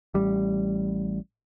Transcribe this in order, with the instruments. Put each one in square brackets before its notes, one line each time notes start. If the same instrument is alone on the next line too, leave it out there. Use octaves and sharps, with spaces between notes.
[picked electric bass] A1 G3